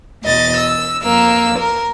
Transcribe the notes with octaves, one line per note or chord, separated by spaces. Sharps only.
E2 B2 D#5 A6
E6
F2 A#3 E6
A#4